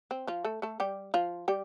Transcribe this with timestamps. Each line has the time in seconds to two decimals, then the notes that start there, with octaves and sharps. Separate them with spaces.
0.11 C4
0.27 F3 F4
0.45 A3 A4
0.62 A3 A4
0.80 G3 G4
1.14 F3 F4
1.48 G3 G4